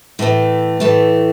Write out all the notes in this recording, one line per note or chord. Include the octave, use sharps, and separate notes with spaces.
A2 E3 A3
A2 E3 A3